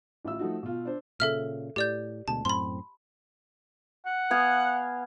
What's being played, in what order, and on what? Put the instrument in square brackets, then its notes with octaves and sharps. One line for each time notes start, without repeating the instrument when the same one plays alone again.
[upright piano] A1 F4 E5 E6
F3 A3 D#4 F#4
B2 F4
D4 C5
[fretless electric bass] A#2 C#3 [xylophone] A4 E5 F6
[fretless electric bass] A2 [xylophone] G4 D5 G6
[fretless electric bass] D2 B2 G#3 [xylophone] A5
[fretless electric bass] F#2 A2 C4 [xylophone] B5 C6
[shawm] F#5
[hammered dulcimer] B3 F5 G#5